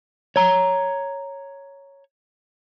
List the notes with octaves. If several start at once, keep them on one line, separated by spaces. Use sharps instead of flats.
C#5 A#5